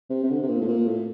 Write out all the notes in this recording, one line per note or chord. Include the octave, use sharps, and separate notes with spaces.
C3
C3
D3
C3
A#2
A2
A#2
A2